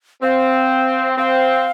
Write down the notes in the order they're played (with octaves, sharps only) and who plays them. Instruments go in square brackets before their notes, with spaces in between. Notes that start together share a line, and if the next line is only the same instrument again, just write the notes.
[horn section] C4 [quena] F5
[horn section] C4 [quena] F5